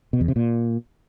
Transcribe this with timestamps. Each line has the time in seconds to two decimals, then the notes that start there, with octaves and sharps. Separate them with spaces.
0.13 B2
0.21 E2
0.28 C3
0.36 A#2